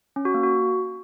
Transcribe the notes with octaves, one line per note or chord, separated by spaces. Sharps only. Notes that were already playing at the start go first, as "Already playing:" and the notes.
C#4
F#4
A#3
F#4